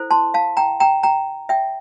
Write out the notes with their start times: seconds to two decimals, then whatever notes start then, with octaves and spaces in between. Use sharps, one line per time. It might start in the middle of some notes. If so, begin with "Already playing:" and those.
Already playing: E4 A4 C5
0.11 A5 C6
0.34 F5 A5
0.57 G5 A#5
0.80 G5 A#5
1.03 G5 A#5
1.49 E5 G5